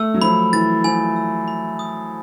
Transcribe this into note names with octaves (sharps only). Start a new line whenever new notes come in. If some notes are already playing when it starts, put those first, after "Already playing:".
Already playing: A3 E6
F#3
F3 B5
E3 A6
F3 G#5
E6
B5
D#6